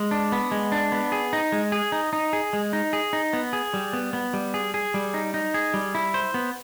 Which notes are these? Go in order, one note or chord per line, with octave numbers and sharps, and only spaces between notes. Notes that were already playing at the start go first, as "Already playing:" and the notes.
Already playing: G#3
D4
B3
G#3
D4
B3
G#4
D#4
G#3
G#4
D#4
D#4
G#4
G#3
D#4
G#4
D#4
B3
G#4
G3
B3
B3
G3
G#4
G#4
G3
D#4
D#4
G#4
G3
E4
C5
B3